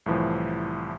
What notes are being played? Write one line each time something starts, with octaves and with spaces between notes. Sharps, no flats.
C2 A2 E3 F3